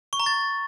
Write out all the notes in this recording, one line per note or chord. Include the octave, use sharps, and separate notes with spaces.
C#6
A#5
A6